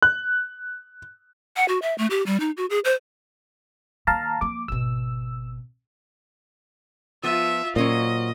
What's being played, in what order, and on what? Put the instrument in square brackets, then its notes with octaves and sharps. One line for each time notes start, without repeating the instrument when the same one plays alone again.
[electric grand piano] F#6
[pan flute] F#5
F#4
E5
A3
G4
G3
D#4
F#4
G#4
C5
[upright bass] D#3 A#3 [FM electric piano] F5 A5 A#5
[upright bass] F3 A#3 [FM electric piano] D6
[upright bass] G#1 B2 [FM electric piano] E6
[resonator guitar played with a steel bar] F3 B3 [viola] F4 E5
[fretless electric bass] A#2 [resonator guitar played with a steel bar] F#3 C#4 C5 [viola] D#5